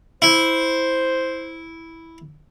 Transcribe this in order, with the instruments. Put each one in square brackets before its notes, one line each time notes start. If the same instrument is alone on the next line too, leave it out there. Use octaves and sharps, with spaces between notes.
[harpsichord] E4 [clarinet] C5